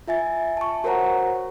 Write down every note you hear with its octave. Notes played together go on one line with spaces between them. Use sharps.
F4 E5 G#5 A6
A5 C#6
F#4 A#4 C5 C#5 F#5 A#5